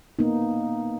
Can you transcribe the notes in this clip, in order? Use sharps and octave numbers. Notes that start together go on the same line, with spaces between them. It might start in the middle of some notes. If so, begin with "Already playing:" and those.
A#3 B3 D#4